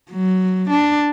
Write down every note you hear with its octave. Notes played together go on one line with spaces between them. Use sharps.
F#3
D4